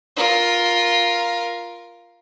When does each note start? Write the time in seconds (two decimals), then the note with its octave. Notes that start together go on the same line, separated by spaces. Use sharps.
0.17 F4 A#4